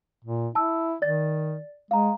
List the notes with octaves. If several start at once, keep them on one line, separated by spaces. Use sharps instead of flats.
A#2
E4 A5 E6
D#3 D5 A6
G#3 F5 A#5